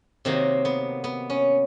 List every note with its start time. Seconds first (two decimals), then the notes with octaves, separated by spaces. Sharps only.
0.25 C3 D#3 F#3 A#3 C4
0.65 B3
1.04 B3
1.30 C#4